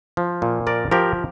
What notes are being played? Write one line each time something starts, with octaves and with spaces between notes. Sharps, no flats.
F3
A#2
F3 A#4 D5
F3 G4 A#4